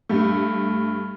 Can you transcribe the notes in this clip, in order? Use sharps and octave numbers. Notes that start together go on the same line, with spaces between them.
G2 A3